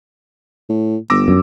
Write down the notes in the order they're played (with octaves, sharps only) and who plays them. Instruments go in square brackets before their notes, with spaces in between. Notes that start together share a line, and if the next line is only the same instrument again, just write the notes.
[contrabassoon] A2
[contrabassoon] G1 [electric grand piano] D6 E6 A#6
[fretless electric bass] F#2